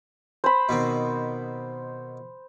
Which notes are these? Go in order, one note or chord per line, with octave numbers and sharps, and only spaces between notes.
C5 B5
B2 D#3 C4